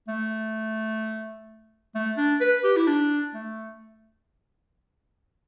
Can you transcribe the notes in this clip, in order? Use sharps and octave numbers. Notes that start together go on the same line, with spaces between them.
A3
A3
D4
B4
G4
E4
D4
A3